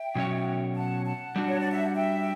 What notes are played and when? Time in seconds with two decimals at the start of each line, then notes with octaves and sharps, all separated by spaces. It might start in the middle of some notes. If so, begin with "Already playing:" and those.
Already playing: E5 G5
0.15 B2 F#3 C#4 F#4 C#5
0.75 F#5 A5
1.06 F#5 A5
1.36 G3 D4 F#4
1.48 C#5
1.60 D5
1.72 E5
1.84 F#5
1.95 E5 G5